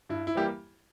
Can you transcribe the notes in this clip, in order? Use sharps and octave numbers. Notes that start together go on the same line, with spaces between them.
G2 E4
E4
E3 G3 A#3 G4